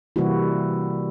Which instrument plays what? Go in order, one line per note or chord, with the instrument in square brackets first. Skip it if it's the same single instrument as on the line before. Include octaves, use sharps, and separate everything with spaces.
[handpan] C3 E3 G3 A#3 E4 F#4